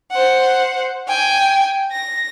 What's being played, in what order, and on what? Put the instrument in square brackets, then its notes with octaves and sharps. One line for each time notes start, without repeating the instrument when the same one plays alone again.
[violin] C5 F#5
G5 G#5
A#6